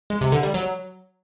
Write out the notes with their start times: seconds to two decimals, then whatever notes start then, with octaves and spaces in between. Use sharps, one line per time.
0.10 G#3
0.21 C3
0.32 D3
0.43 G3
0.54 F#3